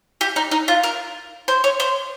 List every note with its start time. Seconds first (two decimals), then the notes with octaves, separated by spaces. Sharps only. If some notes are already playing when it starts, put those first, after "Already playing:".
0.21 G4
0.36 D#4
0.51 D#4
0.68 F4
0.84 A#4
1.48 C5
1.64 C#5
1.80 C5